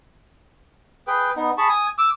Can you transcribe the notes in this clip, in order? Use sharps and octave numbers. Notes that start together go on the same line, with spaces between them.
G#4 B4 G5
B3 D#4
G#4 A5 B5 C#6
G#5 D#6
D6 E6